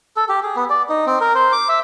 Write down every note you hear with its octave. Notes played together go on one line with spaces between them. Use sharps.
A4
G4
G#4
B3
D5
D#4
C4
A#4
C5
D6
E5